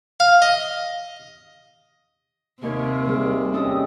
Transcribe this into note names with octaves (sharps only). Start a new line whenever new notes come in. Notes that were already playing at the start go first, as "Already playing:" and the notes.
F5
D#5
D#2 C3 A#4 C#5
G3 A3 G#4
C#4 G4 A4 D#5 D#6